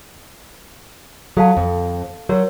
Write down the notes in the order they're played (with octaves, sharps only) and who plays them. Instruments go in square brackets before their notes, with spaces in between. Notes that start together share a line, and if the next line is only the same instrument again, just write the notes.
[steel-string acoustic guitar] F#3 [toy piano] A4 F5 A5
[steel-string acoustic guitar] F2
[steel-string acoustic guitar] F#3 [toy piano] F#4 A#4 C#5